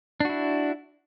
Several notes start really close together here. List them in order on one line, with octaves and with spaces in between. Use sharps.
D4 F#4 E4